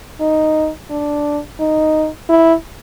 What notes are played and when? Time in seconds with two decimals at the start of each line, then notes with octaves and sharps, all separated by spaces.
0.21 D#4
0.90 D4
1.60 D#4
2.29 E4